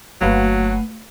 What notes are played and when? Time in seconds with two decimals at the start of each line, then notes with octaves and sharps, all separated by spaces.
0.21 G1 F#3 A3 A#3 F#4 B4 F5